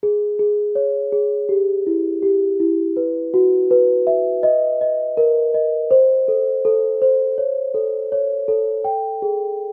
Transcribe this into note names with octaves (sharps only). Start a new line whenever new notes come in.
G#4
G#4
C#5
G#4
G4
E4
G4
E4
B4
F#4
B4
E5
D#5
D#5
A#4
D#5
C5
A4
A4
C5
C#5
A4
C#5
A4
G5
G#4